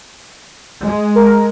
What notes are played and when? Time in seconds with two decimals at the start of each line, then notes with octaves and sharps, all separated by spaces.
0.84 G#3
1.15 A#4